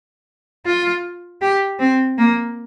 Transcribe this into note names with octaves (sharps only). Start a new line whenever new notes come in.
F4
G4
C4
A#3